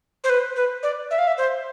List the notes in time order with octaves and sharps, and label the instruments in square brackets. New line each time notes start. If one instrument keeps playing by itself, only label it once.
[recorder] C5
B4
B4
D5
E5
F5
E5
C5